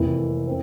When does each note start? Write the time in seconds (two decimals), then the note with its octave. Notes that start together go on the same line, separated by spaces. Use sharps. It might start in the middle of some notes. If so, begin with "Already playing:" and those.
Already playing: F1 F2 E3 A#3 E4
0.47 C4